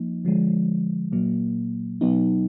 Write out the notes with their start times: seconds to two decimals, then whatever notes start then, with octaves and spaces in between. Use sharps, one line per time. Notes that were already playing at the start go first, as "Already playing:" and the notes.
Already playing: F3 A#3 D#4
0.25 D3 F3 G#3
1.12 A#2 F#3 A#3
2.01 B2 F#3 B3 D#4